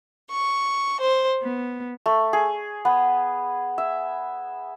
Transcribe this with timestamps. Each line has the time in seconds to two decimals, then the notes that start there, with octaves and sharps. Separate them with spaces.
0.31 C#6
1.01 C5
1.42 B3
2.06 A3
2.33 G#4
2.85 B3
3.78 E5